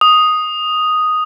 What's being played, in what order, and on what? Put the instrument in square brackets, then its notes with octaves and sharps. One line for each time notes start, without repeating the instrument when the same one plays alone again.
[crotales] D#6